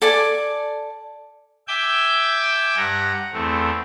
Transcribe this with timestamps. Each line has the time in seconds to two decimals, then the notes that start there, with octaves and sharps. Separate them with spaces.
0.02 A4 D5 G#5 A5
1.68 E5 G5 G#5 D6 E6 G6
2.77 G2 F#5 A#5
3.33 E2 A3 C4